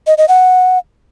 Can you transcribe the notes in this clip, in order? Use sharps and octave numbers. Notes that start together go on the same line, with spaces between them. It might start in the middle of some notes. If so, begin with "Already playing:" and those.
D#5
D#5
F#5